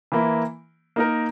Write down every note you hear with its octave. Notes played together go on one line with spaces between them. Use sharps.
E3 A#3 E4
A#3 D#4 A#4